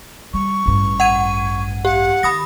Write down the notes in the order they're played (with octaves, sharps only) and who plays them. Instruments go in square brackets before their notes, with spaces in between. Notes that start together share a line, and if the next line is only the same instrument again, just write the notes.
[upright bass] G3 [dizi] C#6
[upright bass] A1 G2
[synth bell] F#5 G#6 D#7
[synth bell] G4 [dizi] F#5
[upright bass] D#3 [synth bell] B5 D#6 A#6